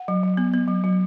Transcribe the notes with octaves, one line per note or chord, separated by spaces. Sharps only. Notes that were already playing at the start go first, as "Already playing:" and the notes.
Already playing: F#5
F#3
F#3
B3
B3
F#3
F#3